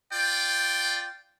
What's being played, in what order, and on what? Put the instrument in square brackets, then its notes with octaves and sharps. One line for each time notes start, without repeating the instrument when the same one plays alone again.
[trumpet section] F4 D5 G5